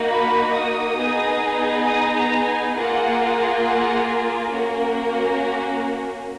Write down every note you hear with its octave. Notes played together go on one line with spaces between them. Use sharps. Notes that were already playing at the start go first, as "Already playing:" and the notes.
Already playing: A#3 D#4 F#4
B5
D#6
B3 D#4 G#4
D#6
A#5
G#5
A#3 F4 G#4 F#5
F#5
A#4
A#3 C#4 F#4